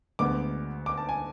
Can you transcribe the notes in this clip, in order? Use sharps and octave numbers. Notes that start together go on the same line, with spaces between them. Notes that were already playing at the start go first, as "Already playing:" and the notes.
D2 D3 G#3 B3 D6
D6
A5
G#5